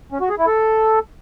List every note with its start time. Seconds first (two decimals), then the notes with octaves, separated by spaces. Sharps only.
0.12 C#4
0.21 F#4
0.29 G#4
0.38 E4
0.47 A4